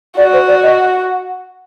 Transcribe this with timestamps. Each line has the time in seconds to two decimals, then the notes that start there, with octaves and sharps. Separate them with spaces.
0.17 F#4 D5
0.33 C5
0.47 D5
0.63 D#5
0.78 F#5